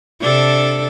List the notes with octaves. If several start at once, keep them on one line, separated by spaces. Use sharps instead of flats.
C3 D4 A4